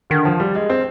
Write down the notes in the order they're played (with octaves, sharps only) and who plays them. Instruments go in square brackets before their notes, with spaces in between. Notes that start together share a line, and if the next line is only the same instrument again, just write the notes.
[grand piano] D3 [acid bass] D#3
[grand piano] F3
G3
G#3
C4